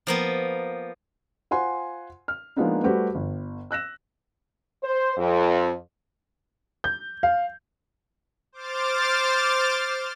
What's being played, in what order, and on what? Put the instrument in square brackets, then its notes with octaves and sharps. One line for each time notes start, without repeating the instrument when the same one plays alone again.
[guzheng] F3 A#3 B3
[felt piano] F4 C5 F#5 G#5 C6
F6
F3 G#3 A#3 B3 D4 D#4
G3 A3 F#4 G4 B4 C5
G1
E6 F#6 A#6 E7
[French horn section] C5
F2
[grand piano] G6
F5
[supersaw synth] C5 D6 F6 A6